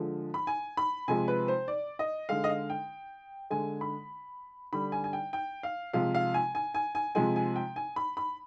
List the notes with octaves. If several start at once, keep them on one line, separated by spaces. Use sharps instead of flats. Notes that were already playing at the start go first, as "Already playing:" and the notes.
Already playing: D3 F3 G#3
B5
G#5
B5
C3 F3 G#3 G#5
B4
C5
D5
D#5
D3 G#3 F5
D#5
F5
G5
D3 G#3 G#5
B5
D3 G3 B5
G#5
G#5
G5
G5
F5
C3 F3 G#3 F5
F5
G#5
G#5
G#5
G#5
C3 F3 G#3 G#5
G#5
G5
G#5
B5
B5